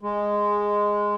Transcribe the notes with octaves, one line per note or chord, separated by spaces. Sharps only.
G#3